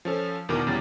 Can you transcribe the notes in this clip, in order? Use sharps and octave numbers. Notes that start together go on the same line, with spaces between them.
F3 C#4 A4
E2 B2 D#3 B3 A#4 D6
E2 C#3 G3 A6